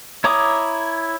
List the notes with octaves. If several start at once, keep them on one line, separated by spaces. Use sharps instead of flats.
E4 C#5 A#5 D6 D#6